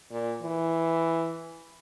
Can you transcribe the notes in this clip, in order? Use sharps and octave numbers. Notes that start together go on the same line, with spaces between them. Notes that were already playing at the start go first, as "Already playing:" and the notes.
A#2
E3